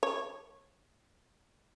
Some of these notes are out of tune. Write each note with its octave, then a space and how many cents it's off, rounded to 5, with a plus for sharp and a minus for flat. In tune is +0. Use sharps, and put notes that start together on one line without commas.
C#5 -25